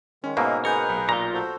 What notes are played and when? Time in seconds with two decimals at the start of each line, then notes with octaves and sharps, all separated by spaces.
0.24 D#3 G#3 C#4
0.37 G#2 B2 A#3 E5 F5
0.65 G#4 A#4 B4 G#5 G6 C#7
0.89 B1
1.09 A#2 F4 A#5
1.34 F#4 A4 C5